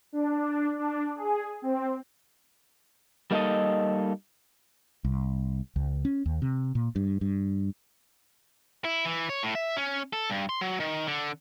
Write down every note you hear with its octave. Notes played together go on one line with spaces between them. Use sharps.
D4
D4
G#4
C4
G3 A#3 D#4 F#4 A4 D#5
C2
C#2
C#4
D#2
C3
A#2
G2
G2
E4
E3
C#5
A2
E5
C#4
A4
G2
C6
F#3
D#3
D3